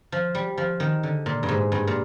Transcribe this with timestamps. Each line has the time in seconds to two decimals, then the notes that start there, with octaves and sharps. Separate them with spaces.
0.12 F3
0.35 G3
0.58 F3
0.80 D#3
1.03 D3
1.26 A#2
1.43 G2
1.49 G#2
1.72 G2
1.87 A#2